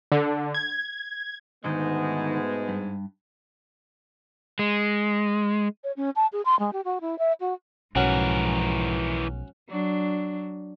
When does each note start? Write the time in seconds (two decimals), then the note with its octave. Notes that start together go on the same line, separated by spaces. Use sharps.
0.12 D3
0.55 G#6
1.64 G#2 B2 D3 D#3 G#3 A3 B3
2.69 G2
4.59 G#3
5.84 C#5
5.97 C#4
6.16 A5
6.33 G#4
6.45 C6
6.59 G#3
6.73 G4
6.85 F#4
7.01 E4
7.19 E5
7.40 F#4
7.96 B1 G#2 E3 F3 C#4 F#4 A#4
9.69 F#3 D4